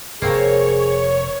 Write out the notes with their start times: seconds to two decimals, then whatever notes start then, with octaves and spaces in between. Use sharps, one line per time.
0.22 F1 A#3 C4 G#4 C#5